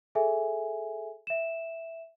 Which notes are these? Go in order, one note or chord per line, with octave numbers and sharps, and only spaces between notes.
G#4 A4 E5 G#5
E5 E7